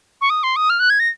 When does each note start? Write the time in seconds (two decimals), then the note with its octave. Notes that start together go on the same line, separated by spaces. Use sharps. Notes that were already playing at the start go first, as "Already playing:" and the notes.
0.21 C#6
0.30 D#6
0.43 C6
0.56 D#6
0.70 F6
0.80 F#6
0.90 G#6
1.00 A#6